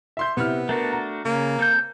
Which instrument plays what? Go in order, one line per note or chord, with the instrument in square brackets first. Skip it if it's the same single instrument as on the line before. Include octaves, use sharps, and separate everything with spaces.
[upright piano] E5 C6 G6
[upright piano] C3 E4 F6 [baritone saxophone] B3
[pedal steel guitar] A3 D4 F#4 [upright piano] A#4
[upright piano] A#5
[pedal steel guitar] C#3 [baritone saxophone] A#3
[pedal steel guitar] C4 A4 G6